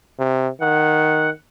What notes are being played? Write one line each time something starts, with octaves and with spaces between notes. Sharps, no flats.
C3
D#3 F#5